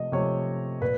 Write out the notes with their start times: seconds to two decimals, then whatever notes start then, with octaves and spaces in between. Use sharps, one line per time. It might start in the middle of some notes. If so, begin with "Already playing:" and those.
Already playing: C3 F3 A3 D#5
0.12 C3 F3 A3 C#5
0.81 A#2 B4